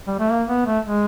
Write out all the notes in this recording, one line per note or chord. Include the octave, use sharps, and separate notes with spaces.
G3
A3
A#3
B3
A3
G#3